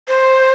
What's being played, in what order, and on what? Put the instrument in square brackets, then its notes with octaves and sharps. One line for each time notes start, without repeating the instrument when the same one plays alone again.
[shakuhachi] C5